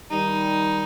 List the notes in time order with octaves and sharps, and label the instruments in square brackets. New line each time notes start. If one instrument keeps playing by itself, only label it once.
[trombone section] D#3 G3 [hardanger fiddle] D#4